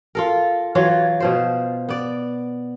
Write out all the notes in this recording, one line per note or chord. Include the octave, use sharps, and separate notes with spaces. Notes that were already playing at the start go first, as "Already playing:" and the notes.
F4 A4 A#4
E3 F#3 F4 C#5
B2 F3 C5
B3 D5